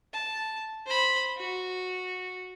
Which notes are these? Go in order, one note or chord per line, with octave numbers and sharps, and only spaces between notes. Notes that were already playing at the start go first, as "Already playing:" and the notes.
A5
C5 B5
F#4